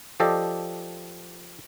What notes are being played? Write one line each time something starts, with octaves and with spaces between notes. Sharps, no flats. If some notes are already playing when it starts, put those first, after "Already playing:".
F3 G4 A4 D5 D#5